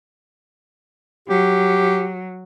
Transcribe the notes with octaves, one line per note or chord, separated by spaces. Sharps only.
F#3 G4